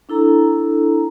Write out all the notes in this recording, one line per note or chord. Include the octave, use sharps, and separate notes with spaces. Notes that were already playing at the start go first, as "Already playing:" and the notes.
D4 E4 A4 A#5